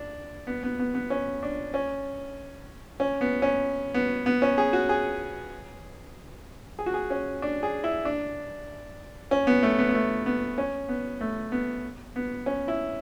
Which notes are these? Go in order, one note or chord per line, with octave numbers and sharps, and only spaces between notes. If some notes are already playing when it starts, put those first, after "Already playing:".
Already playing: D4
B3
B3
B3
B3
C#4
D4
C#4
C#4
B3
C#4
B3
B3
C#4
G#4
F#4
G#4
G#4
F#4
G#4
C#4
D4
G#4
E4
D4
C#4
B3
A3
B3
B3
A3
B3
C#4
B3
A3
B3
B3
C#4
E4